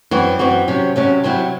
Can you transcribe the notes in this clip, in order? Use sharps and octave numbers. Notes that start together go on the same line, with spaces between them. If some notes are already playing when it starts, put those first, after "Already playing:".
F#2 E3 C4 F#4
F#2 E3 C4 F#4
C3 F#3 C#4
C3 F#3 C#4
C3 F#3 C4 E4